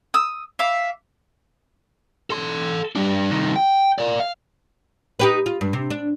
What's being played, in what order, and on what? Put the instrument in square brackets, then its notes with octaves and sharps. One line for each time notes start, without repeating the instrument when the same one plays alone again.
[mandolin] D#6 E6
E5 F5 D6
[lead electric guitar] A4 C6
G3 D4
C2 D#3
G5
A#4 D5
F5
[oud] D#4 G4 B4
F4
G2
C3
D4